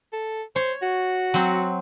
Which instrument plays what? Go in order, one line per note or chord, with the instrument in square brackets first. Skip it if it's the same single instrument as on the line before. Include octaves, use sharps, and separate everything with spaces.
[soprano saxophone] A4
[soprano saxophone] C5 [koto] C#5
[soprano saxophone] F#4
[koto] F#3 C4